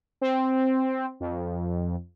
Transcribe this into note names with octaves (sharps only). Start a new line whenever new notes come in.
C4
F2